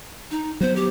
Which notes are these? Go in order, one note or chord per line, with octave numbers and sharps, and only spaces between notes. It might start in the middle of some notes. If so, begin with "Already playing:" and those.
D#4
F#3 B3 C5
G4